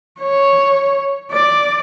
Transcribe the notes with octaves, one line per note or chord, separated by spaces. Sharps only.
C#5
D5